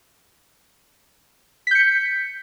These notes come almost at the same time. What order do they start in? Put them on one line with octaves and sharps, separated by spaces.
B6 G6 C#7